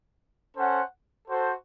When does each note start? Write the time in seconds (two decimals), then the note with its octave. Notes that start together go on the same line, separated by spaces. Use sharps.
0.57 C#4 A4 C5 F#5
1.27 F#4 A4 C5